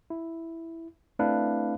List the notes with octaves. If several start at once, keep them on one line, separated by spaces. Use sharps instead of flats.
E4
A3 C4 D4 E4 B4 F5